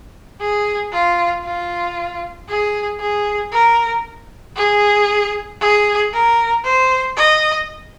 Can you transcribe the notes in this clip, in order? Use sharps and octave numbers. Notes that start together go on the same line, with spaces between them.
G#4
F4
F4
G#4
G#4
A#4
G#4
G#4
A#4
C5
D#5